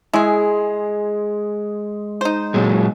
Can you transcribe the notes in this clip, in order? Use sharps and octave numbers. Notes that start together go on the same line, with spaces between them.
G#3 E4 G#4
D#4 C5
A#2 F#3 G#3